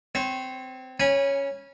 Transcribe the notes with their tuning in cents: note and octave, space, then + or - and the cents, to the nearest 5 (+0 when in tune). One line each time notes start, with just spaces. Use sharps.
C4 -20 C#5 -35
C#4 +0 G#5 -20 B5 -30